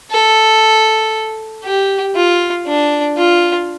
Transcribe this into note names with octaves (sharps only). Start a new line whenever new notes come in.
A4
G4
F4
D4
F4